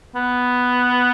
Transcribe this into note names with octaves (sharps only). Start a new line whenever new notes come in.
B3